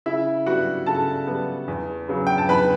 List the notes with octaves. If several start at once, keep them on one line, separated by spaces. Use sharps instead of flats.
C#3 E4 E5
G3 B3 F#4 F#5
C#3 A4 A5
G3 B3
E2
C#3 F#3 B3
G5
A5
E2 B4 B5